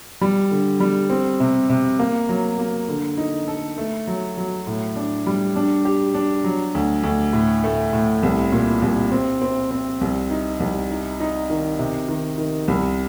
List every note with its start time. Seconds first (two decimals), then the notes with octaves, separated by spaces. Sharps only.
0.21 G3
0.51 D3
0.80 G3
1.10 C4
1.40 C3
1.69 C3
1.99 A#3
2.29 F#3
2.58 A#3
2.89 D3
3.17 D#4
3.47 A4
3.78 A3
4.07 F#3
4.37 F#3
4.67 A2
4.96 D4
5.27 G3
5.56 D4
5.85 G4
6.14 D4
6.44 F#3
6.75 D2
7.03 D2
7.33 A2
7.64 A3
7.93 A2
8.23 C2
8.52 A#2
8.82 C2
9.12 C4
9.42 C4
9.71 C4
10.01 C2
10.30 D#4
10.60 C2
10.90 D#4
11.20 D#4
11.50 D#3
11.79 C3
12.08 D#3
12.38 D#3
12.68 C2